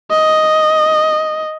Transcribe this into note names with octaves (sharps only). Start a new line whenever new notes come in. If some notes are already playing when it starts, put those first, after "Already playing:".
D#5